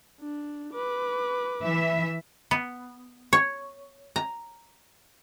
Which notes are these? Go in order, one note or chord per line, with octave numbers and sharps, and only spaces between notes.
D4
B4 D6
E3 E5
B3
C#5
A#5